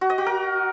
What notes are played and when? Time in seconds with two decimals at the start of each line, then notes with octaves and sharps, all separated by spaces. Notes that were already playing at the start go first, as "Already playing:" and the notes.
0.01 F#4
0.10 D#5
0.18 F#4
0.26 A#4